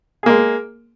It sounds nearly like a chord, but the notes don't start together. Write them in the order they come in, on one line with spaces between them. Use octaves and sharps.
G#4 A#3 G#3